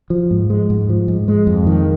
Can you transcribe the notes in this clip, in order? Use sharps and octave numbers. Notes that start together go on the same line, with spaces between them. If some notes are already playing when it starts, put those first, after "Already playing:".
F3
G#2
G#3
G#2
F3
G#2
G#3
F2
D#3